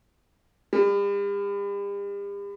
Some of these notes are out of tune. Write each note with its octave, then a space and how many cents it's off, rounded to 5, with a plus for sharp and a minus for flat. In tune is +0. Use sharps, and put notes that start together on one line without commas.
G3 +40